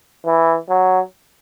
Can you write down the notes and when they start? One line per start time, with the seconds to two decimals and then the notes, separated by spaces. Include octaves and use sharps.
0.26 E3
0.69 F#3